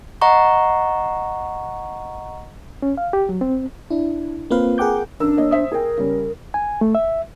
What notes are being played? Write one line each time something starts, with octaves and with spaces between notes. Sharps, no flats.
D#5 F#5 A#5 C#6
C#4
F5
G4
F#3
C4
D4 E4
A#3 C4 F4 B4 F5
G#4 A#4 F#5 G5 D6 G6
A1 D4 A#4 E6
A#3 C#5 D#5
C5 E5 D#6
G#4 A#4 G5
C#3 G3 C#4
G#5
A3
E5